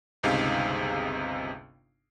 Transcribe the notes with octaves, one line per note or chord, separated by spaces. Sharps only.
G1 C#2 C3 D#4 G#4 F5